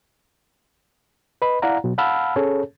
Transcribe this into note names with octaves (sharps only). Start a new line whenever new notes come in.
B4 D#5 B5
E4 D5 F5 F#5 A#5
B2 F#3
F5 F#5 A5 B5 E6 F6
C#4 G#4 A4 C#5